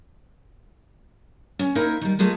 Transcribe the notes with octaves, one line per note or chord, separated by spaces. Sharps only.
C#4
A#3 D#4 E4 A#4 C5 E5
D#3 G3
G#3 A3 F4 G#4 A#4